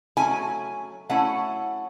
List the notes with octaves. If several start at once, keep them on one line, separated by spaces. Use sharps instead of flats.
F#3 A3 C#4 E4 G#5
F#3 A3 C#4 E4 F#5